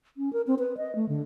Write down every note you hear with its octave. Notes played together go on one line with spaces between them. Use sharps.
C#4
A#4
C4
B4
D#5
A3
D3